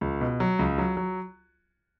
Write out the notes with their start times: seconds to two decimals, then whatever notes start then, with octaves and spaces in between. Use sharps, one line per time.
0.01 C#2
0.21 B2
0.40 F#3
0.59 C#2
0.78 F#3
0.97 F#3